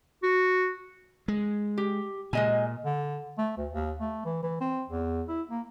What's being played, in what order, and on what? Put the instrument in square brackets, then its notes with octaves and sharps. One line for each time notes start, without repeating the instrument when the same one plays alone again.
[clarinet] F#4
[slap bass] G#3
[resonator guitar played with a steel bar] G4
[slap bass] A#2 [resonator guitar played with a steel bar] G#3 D#5 G#5
[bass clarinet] D3
A3
D2
D#2
A3
E3
E3
C4
E2
E4
A#3